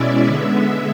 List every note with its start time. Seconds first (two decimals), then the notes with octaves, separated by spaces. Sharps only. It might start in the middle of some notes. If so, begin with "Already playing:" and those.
Already playing: B2 G#3 C#4 E4 D5 E5
0.25 D3 G#3 B3